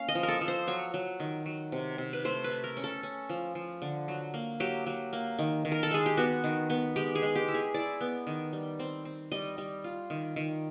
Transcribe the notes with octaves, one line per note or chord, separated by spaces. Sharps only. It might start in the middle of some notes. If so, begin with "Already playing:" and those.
Already playing: A#3 C#4 F5
D#5
F3
A#4
A4
F3
C5
F#3 C#5
F#3
D#3
F#3
C3
C3
B4
A3 C5
B4
A3
A#4
C#4
A4
C#4
F3
F3
D3
F#3
A#3
F#3 G4
F#3
A#3
D#3
D#3
A#4
A4
G#3 G#4
G4
B3 F#4
D#3
B3
G#3 G4
G#4
G#3
G4
E4
G#4
E4 D5
B3
D#3
G3
C4
C4
G3 D#5
G3
F4
D#3
D#3